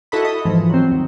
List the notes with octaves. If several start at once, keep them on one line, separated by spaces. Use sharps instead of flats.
E4 F#4 A4 D#5 B5
D#5
G#2 E3 F3
F#3 C4
D#2